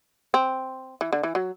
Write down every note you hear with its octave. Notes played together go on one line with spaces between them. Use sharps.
C4
E3
D3
E3
F#3